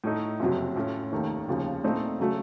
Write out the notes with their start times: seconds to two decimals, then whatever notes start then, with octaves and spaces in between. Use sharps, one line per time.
0.04 A2 A3 D#4
0.40 F#1 F2 C3 F#3
0.76 A2 A3 C#4 F4
1.11 F1 D#2 D#3 A3
1.48 F1 D#2 C#3 F3
1.84 A#2 A3 C4 D#4
2.20 C#3 F#3 A3